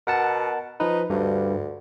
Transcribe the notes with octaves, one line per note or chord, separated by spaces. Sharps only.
B2 A#4 F#5 A5
F3 D#4 B4
D2 G2